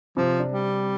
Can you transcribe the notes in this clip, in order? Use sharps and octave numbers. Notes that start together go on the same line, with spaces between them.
C3 F3
D4
G3